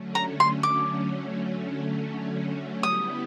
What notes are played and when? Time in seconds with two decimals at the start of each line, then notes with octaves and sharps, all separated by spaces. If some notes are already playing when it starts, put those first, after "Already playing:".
Already playing: D3 F#3 A3 C#4
0.15 A#5
0.40 C6
0.63 D6
2.83 G3 B3 E4 G4 D#6